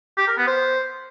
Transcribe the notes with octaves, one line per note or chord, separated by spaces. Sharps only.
G4
A#4
B3
C5